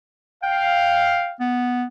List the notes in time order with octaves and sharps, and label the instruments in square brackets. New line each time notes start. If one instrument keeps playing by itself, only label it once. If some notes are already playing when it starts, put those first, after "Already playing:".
[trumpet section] F5 [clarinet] G5
[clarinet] B3